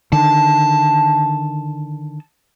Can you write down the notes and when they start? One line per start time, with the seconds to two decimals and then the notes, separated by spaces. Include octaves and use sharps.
0.12 D3 D#3 A5